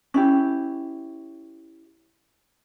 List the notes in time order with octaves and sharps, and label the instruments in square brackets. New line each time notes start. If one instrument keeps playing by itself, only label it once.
[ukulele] C#4 E4 G4